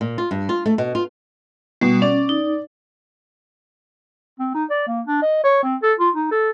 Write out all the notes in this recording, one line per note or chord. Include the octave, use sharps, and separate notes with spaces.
A#2
F4
G2
F4
A3
B2
F4
B2 G3
C#4 D5
D#4
C4
D#4
D5
A#3
D4
D#5
C#5
C4
A4
F4
D#4
A4